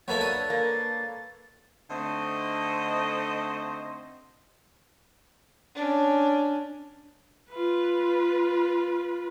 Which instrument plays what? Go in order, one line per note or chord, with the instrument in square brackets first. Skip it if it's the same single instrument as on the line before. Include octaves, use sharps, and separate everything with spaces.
[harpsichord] F#3 A#3 E4 [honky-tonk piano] A4 B4 C#5 [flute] A6
[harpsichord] D4 D#6
[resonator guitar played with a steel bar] A#3
[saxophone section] D3 A3 C4 D#4 C5 D#5
[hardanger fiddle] C#4 D4
[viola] F4 B4